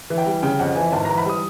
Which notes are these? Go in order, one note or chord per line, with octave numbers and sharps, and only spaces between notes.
E3
G5
G3
C#3 G5
F2 F#5
E3 G#5
G#1 A5
E3 A#5
B5
G3 D#6